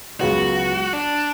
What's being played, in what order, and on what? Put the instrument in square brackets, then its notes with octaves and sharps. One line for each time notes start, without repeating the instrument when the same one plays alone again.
[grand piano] C#2 C#3 F#3 B3 [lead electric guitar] F#4
[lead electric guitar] D4